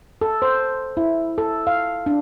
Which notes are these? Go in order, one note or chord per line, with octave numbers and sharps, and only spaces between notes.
A4
C5
E4
A4
F5
D4